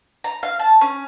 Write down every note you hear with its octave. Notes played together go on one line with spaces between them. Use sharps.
A#5
F5
A5
C#4